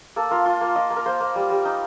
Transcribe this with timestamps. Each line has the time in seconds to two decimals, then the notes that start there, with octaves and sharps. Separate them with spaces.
0.16 A#3 A4
0.31 F4 A#4
0.46 F4
0.61 A#3
0.76 F4 D#5
0.91 A#3
0.96 A#4
1.06 A#3 C5
1.21 A#3
1.36 G3
1.50 G3
1.65 D#4